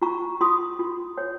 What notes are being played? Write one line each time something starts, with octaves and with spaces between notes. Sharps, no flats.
F4 A#5 C#6
F4 C6 D#6
F4
C#5